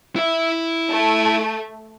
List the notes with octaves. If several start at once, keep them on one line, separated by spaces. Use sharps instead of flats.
E4 E5
A3